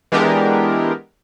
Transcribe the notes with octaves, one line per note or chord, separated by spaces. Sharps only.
E3 G#3 B3 D4 G4 A#4